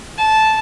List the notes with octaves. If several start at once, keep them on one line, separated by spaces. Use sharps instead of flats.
A5